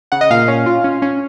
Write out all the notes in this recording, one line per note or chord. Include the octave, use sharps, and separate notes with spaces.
C#3 F#5
D#5
A#2 F5
C#4
F4
C#4
C#4